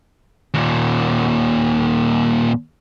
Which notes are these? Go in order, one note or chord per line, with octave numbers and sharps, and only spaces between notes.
D#2 A#2